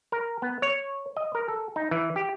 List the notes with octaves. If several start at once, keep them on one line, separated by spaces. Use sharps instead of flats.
A#4
B3
C#5
D#5
A#4
A4
D#4
E3
G4